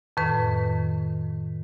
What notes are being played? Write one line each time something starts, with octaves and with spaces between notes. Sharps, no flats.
F2 A2 D#3 B4